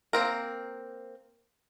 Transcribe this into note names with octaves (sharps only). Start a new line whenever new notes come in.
A#3 C4 A#4